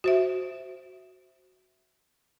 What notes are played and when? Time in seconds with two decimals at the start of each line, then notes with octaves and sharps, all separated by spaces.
0.04 F#4 C5 E5